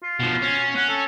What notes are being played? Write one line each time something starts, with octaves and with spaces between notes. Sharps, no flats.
F4
B2 F3
C#4
C#4 F#5
A4